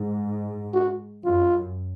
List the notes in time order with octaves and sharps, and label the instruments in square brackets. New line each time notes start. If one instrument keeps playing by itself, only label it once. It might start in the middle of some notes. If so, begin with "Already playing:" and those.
Already playing: [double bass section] G#2
[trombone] F#4
[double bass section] F#2 [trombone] F4